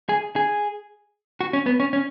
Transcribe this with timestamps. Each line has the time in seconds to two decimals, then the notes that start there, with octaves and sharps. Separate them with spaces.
0.09 G#4
0.36 G#4
1.41 F#4
1.53 C#4
1.66 B3
1.80 C#4
1.93 C#4